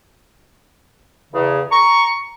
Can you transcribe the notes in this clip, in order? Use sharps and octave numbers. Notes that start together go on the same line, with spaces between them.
E2 C#3
A#5 C#6